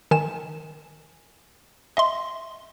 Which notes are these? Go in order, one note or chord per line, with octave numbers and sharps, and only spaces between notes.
D#3 G#5 E7
D#5 E5 C6